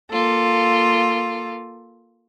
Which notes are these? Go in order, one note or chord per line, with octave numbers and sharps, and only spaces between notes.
A#3 F4 A4